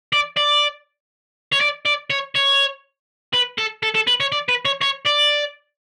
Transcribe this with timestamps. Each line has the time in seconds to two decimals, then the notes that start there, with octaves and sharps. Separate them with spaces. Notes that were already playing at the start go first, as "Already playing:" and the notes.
0.13 D5
0.37 D5
1.52 C#5
1.60 D5
1.86 D5
2.10 C#5
2.35 C#5
3.33 B4
3.58 A4
3.83 A4
3.95 A4
4.07 B4
4.20 C#5
4.32 D5
4.48 B4
4.65 C#5
4.82 C#5
5.06 D5